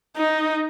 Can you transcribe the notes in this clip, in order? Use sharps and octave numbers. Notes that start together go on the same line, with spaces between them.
D#4